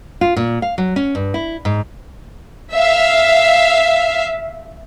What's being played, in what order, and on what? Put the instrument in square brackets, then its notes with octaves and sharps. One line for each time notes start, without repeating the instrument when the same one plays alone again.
[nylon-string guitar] F4
A#2
F5
F#3
C#4
G2
E4
G#2
[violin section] E5 F5